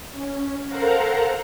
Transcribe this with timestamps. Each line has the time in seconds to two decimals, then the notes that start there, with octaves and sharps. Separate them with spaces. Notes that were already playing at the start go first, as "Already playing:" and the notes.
0.11 C#4
0.67 A4 A#4 C5 F5 F#5 A#5